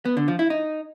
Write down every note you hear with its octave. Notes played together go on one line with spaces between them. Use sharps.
B3
D3
F3
E4
D#4